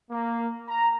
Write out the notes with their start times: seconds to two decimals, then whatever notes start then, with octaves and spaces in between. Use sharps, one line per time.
0.10 A#3
0.68 A#5